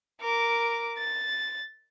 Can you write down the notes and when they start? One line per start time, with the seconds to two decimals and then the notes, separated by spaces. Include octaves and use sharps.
0.21 A#4 D6
0.98 A6